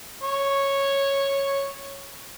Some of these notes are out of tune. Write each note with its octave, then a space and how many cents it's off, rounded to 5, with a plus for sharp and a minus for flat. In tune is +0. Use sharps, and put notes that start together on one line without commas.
C#5 -5